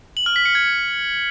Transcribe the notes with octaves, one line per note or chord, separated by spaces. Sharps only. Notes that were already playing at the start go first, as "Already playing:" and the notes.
F#7
F6
B6
C#7
G#6